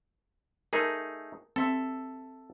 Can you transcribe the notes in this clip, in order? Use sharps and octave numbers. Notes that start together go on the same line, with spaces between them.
A3 D#4 G#4 A#4
C4 A4 E5